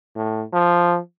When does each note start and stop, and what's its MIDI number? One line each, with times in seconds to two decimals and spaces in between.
0.15 0.43 45
0.53 0.98 53